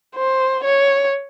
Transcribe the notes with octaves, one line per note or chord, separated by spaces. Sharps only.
C5
C#5